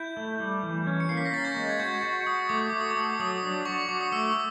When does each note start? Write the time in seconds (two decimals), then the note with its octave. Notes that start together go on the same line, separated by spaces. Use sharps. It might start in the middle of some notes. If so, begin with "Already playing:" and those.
Already playing: E4 G6
0.17 A3
0.40 G3
0.63 E3
0.87 C#4
1.00 C#7
1.09 A#3 C7
1.17 B6
1.25 A#6
1.33 C#4 A6
1.45 G6
1.57 G#3
1.69 G#6
1.79 F#4 G6
2.03 F#4
2.27 F#4 D#6
2.49 A3 D6
2.60 D#6
2.70 F#4 D6
2.81 D#6
2.91 D6
2.97 A4 D#6
3.10 D6
3.20 F#3 D#6
3.31 D6
3.43 D4
3.65 F#4 C#6
3.78 C#6
3.88 F#4 D6
4.01 D#6
4.12 A3 E6